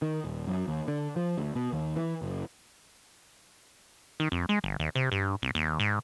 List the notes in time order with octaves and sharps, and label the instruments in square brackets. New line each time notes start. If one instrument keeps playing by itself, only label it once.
[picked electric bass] D#3
D#1
F#2
D#2
D3
F3
D2
B2
D#2
E3
F#1
[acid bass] D#3
F2
G#3
G1
D#2
C3
G2
C2
D#2
G#2